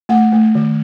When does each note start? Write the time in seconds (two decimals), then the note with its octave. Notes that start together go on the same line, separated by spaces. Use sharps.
0.09 A3 F#5
0.32 A3
0.55 D#3